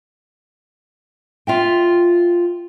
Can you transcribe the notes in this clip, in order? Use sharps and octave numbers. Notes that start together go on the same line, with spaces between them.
F4 E5 G5